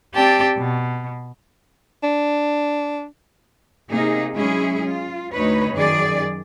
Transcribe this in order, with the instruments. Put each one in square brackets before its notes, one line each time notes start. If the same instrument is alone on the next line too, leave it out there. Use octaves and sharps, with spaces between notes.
[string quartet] C4 G4 D5 G5 A5
B2
[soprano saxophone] D4
[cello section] C3 A#3 D#4 G#4
F#3 G#3 C#4 E4 G#4
F4
D2 D#4 B4 C#5
F#2 D#3 G#4 D5